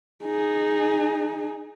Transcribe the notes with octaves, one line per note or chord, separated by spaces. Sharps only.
D#4 G#4